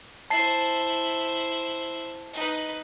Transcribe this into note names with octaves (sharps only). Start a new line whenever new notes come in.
E4 C5 A5 C7
D#4 B4